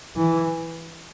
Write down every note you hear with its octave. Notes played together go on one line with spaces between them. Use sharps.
E3